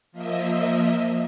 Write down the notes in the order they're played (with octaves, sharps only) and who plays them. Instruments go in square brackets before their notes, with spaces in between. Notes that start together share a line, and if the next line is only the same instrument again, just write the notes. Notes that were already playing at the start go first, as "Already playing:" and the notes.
[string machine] F3 A#3 D#5 E5